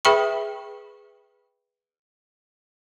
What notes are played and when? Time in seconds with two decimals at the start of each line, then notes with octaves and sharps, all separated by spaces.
0.05 G#4 B4 E5 G5 B5 C#6